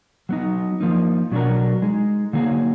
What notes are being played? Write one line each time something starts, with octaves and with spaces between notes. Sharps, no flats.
F#3 B3 D#4
F3 A#3 D#4
B2 F#3 D4 F#4 A#4
G#3 D#4 G#4
D3 F#3 A#3 D#4 G#4